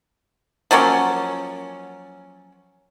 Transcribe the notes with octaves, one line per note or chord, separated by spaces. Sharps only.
F3 F#3 A#3 C#4